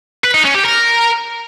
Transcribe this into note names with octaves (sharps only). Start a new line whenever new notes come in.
B4
D#4
C#4
G4
A#4